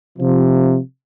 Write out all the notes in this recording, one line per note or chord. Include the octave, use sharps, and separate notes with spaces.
C3 F3